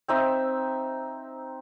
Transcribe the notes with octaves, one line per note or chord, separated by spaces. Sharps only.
C4 D#4 E5